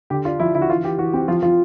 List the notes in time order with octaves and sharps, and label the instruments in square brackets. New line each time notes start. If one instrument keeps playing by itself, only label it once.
[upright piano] D3 [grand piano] G4
[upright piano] D4 [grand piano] F4
[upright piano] F3 [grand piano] E4
[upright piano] D3 [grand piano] E4
[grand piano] F#4
[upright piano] E3 [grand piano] F4
[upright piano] E3 [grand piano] G4
[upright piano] E3 [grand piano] F#4
[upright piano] C4 [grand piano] G4
[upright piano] F3 [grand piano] F4
[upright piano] F3 [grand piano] F4